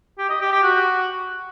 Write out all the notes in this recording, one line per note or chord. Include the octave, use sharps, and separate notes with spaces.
G4
D#5
G4
G4
F#4